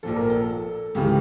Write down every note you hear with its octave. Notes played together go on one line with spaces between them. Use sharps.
A#1 A#2 F3 A4
A#4
A4
C#2 C#3 E3 G4